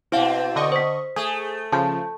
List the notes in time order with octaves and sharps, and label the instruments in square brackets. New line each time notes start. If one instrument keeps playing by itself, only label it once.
[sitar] B2 C4 [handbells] E4 F5 F#5
[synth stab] D3 D#5 C#6
[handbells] C5 B6
[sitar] A3 [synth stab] G#4
[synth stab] C#3 F3 [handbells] A5 G6